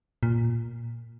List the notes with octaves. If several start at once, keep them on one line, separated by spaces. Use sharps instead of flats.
A#2